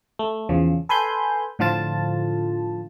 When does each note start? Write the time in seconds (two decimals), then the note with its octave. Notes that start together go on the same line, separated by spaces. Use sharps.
0.19 A3
0.49 E2 C#3 F3
0.89 A4 B4 G#5 B5 C6 G6
1.59 A2 D3 F3 F4 A5